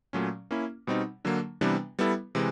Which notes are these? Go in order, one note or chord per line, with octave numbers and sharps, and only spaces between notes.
A#2 F#3 A3 C#4
A#3 C#4 E4
B2 G3 C4 D#4
D3 F#3 A#3
C3 E3 G3 B3 D4
G3 B3 E4 A4
C3 E3 G#3